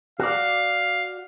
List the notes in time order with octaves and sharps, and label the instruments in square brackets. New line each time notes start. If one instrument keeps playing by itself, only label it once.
[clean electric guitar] F#4 D5 [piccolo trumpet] F5